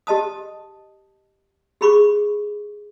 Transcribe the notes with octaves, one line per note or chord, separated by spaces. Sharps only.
G4 D#5 A5 D#6
G4 G#4 B5 C#6 D6